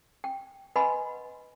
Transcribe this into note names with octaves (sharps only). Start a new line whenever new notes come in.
G5
B4 D#5 F#5 G#5 B5 C6